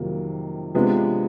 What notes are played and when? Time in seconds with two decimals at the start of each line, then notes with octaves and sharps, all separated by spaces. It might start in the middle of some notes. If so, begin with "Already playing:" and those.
Already playing: F2 C3 D#3 F#3 A#3
0.74 C3 F3 G#3 B3 D4